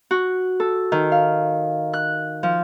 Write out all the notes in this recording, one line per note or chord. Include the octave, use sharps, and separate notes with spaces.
F#4
A4
D#3
F5
F#6
F3